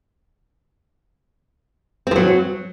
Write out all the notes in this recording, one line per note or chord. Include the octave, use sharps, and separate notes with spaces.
F3 F#3 C4